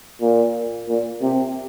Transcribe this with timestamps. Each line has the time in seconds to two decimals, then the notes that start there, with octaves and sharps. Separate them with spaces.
0.21 A#2
0.88 A#2
1.22 C3